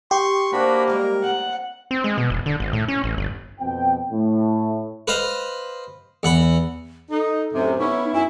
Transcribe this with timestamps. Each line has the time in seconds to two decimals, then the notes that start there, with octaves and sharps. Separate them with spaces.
0.11 G4 C6 C#6
0.52 A#3 C4 D4 F#4 C5 B5
0.88 G3 G#3 F#4 A#4
1.24 C4 F#5
1.91 C4
2.04 G#3
2.18 B2
2.30 E1
2.46 D3
2.60 G#1
2.73 A2
2.88 C#4
3.04 A1
3.18 G1
3.59 F2 B2 C4 G5
4.12 A2
5.08 B4 C5 D#5 F5
6.23 E2 F#5 B5
7.11 D#4 A4
7.53 F#2 A2 C3
7.79 B3 C#4 D#4 E4
8.14 F#2 E4 G#5